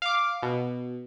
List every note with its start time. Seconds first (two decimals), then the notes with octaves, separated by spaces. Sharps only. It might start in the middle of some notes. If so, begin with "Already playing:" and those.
0.02 F5 D6
0.43 B2